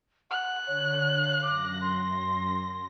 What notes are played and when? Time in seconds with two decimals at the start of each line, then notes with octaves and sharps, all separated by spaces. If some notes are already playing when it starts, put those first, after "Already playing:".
0.31 F#5 F#6
0.67 D3 C#5
1.10 F5
1.43 F#2 D6 A#6
1.82 C6